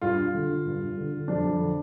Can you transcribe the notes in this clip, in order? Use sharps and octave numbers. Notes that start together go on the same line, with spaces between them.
G2 F4
G2
D3
D3
G2
G2
D3
D3
F2 D4
F2
D3